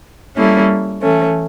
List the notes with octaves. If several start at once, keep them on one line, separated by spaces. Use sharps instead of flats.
G3 A#3 C#4 E4 A4
E3 A3 C#4